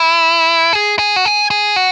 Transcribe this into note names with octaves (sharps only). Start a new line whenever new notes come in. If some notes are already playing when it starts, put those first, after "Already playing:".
Already playing: E4
G#4
G#4
F#4
G#4
G#4
F#4